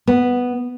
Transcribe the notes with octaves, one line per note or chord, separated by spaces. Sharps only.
B3